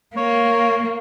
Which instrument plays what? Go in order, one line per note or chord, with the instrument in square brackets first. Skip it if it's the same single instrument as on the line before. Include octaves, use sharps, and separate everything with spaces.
[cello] A#3 [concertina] C#5